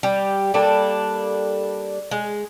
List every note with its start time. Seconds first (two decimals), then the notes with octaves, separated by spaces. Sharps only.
0.03 G3 G4
0.54 G3 A#3 D4 A4
2.11 G#3